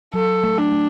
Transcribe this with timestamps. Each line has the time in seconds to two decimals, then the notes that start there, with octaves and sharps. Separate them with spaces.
0.14 F#3 A4
0.44 A3
0.57 D4
0.72 A3